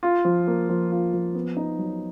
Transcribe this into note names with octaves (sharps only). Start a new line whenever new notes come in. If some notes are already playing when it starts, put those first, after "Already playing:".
F4
F3
A#3
F3
F4
F3
B3
D#4
F#3